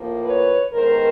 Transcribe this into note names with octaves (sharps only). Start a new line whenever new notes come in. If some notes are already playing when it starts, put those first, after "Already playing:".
Already playing: A2 F3 A#3
B4 C#5
G2 D#3 G#3 B3 A#4 C5